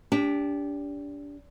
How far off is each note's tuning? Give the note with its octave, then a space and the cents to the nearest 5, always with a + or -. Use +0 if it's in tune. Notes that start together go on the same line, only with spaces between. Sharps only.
D4 -30 G4 +15